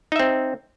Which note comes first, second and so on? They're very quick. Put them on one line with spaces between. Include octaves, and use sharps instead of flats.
D#4 E5 C4